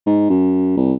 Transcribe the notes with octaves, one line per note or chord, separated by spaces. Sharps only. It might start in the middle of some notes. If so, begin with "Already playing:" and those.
G#2
F#2
C2